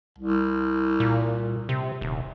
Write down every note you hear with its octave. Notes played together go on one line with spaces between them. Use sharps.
C2
A#2
C3
D#1